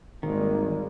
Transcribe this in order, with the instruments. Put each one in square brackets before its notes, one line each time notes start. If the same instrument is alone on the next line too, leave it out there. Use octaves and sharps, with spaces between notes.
[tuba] G#1 [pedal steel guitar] D#3 [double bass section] G3 G#3 A#3